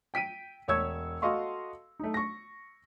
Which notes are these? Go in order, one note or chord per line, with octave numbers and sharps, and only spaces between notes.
G5 B6 D7 D#7
E1 C#5 C#6 E6 G#6
F#4 A4 D#5 F5 C6 C#6
A3 D#4
C#6 A#6